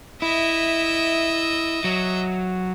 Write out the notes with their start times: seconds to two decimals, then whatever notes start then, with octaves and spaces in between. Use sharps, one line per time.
0.22 E4 D#5 E5
1.84 F#3